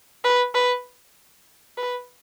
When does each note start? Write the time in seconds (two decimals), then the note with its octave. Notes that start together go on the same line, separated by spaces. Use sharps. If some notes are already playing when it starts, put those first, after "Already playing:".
0.25 B4
0.55 B4
1.78 B4